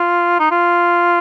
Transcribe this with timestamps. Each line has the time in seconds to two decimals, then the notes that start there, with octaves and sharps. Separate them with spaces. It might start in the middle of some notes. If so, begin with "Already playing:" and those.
Already playing: F4
0.40 D#4
0.51 F4